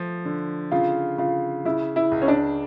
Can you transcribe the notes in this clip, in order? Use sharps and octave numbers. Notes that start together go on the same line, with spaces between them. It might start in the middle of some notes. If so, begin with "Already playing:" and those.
Already playing: F3 A3
D3
C#3 F4
C#3 F4
C#3 E4
E4
C#2
C#4
D4